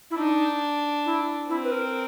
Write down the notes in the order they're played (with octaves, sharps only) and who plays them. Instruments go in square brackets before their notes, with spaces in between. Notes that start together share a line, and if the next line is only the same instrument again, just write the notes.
[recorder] E4
[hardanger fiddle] D4 [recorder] D#4
[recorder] E4
[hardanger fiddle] C4 [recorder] E4
[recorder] B4
A#4